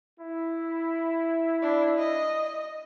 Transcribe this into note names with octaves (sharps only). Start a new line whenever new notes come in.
E4
D4
D#5